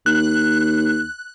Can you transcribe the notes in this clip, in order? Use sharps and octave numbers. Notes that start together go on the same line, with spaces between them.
D#2 F#6